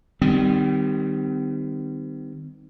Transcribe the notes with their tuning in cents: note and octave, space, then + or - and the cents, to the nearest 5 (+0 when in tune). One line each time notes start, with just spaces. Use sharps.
D#3 -25 G3 +0 C4 -45